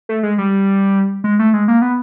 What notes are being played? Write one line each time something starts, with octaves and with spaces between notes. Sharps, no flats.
A3
G#3
G3
G#3
A3
G#3
A#3
B3